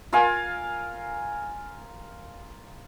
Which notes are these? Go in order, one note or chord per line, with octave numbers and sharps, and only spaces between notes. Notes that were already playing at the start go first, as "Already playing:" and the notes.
F4 A#4 F5 G#5